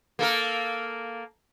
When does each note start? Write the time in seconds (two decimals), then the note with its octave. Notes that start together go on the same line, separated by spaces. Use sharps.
0.19 A#3 A4 A#4